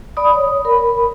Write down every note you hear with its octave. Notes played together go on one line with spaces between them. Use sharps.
D5 B5 D#6
C#5
A#4 B5